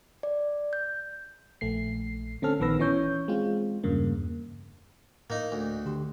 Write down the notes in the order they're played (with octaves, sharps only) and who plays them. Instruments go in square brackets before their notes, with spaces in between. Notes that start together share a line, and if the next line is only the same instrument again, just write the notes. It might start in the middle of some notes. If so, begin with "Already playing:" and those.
[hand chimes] D5
G6
[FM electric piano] A#1 A3 C7
D3 C4 C#4 A4 F6
A#1 D#3 B3 B4 E6 A#6
E3 C#4 C#5 G6
G#3 C4 F4
E2 G2 C#3 A#3
[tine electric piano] A2 [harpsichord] A#3 D#4
[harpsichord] D2
[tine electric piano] D3 G4 C6